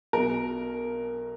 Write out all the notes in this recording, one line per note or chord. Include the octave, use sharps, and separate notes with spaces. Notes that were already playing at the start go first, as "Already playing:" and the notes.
B1 B2 A#4